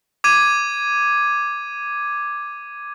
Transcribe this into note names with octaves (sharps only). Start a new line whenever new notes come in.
D6 G#6 D#7